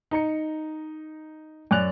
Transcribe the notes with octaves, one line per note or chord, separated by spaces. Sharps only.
D#4 A#5 C#7
F#2 D5 G#5 F#6 F7